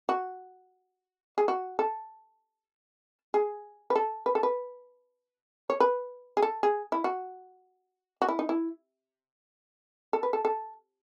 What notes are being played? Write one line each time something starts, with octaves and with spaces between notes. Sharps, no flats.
F#4
G#4
F#4
A4
G#4
B4
A4
B4
A4
B4
C#5
B4
G#4
A4
G#4
E4
F#4
F#4
E4
D#4
E4
A4
B4
A4
A4